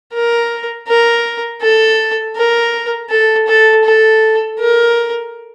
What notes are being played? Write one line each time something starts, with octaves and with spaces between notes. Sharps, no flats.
A#4
A#4
A4
A#4
A4
A4
A4
A#4